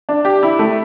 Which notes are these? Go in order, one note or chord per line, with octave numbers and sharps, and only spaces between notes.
D4
G4
E4
A3